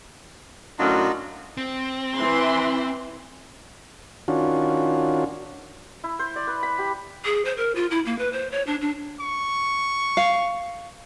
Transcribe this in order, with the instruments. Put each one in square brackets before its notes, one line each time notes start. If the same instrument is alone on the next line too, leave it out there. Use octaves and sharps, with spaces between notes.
[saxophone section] F#2 A2 D4 [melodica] D#4 F4 F#4
[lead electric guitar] C4
[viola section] E3 C6
[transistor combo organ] D#3 C#4 D4 F4 F#4
[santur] E4
C5
D5
B4
B5
G4
[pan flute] G#4
C5
A#4
F4
E4
A#3
B4
C5
C#5
D4
D4
[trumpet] C#6
[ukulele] F5